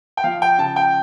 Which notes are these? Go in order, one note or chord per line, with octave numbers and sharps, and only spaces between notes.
G5
F3 F5
G5
C#3 A5
G5